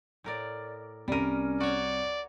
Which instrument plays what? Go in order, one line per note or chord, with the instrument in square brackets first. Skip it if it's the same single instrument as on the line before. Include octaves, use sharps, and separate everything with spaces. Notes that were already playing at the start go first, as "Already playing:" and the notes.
[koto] A2 A#4 D5
[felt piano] C2 D#7 [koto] G3 A#4 [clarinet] C#4
[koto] F#4 C#5 [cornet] D5